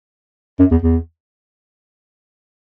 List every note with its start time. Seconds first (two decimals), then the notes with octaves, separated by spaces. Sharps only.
0.60 F#2
0.71 E2
0.83 E2